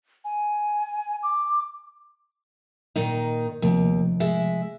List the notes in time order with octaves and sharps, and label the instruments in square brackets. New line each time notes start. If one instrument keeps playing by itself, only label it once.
[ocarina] G#5
D6
[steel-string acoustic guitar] A#2 D#3 D#4
[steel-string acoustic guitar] D#2 [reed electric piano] C3 F3 A3
[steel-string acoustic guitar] G#3 E5